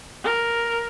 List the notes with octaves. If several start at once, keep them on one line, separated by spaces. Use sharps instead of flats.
A#4